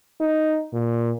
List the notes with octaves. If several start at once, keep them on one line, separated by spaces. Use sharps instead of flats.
D#4
A#2